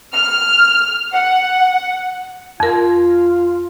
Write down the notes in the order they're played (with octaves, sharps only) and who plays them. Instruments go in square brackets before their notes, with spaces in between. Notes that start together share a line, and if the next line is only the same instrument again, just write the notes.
[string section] F6
F#5
[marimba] F2 A#4 [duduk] F4